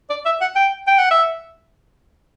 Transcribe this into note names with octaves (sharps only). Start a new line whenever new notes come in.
D5
E5
F#5
G5
G5
F#5
E5